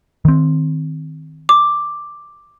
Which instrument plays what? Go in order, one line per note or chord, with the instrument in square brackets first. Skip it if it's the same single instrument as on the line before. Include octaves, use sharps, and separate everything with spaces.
[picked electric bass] D#3 C4
[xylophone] D6